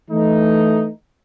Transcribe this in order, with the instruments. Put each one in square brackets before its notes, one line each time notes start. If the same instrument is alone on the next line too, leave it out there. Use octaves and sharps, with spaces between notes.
[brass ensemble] E3 A3 D#4